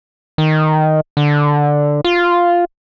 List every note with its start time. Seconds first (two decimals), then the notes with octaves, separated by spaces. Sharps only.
0.38 D#3
1.17 D3
2.05 F4